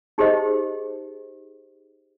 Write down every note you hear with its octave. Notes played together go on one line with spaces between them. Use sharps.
D#4 G4 G#4 C5 D#5